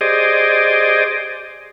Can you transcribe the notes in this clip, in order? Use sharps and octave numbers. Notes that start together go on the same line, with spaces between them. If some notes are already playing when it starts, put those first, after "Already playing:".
G4 G#4 C5 D5 D#5